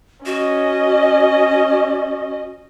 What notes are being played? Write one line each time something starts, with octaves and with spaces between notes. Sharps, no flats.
C#4 F#4 D#5